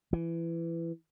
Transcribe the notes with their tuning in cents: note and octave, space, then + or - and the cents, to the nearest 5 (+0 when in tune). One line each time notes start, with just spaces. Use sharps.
E3 +20